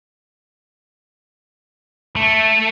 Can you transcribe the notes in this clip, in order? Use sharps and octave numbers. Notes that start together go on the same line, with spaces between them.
A3